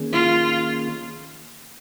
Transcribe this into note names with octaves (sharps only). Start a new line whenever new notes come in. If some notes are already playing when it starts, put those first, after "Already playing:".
Already playing: D#3 A#3 C#4 G#4
F4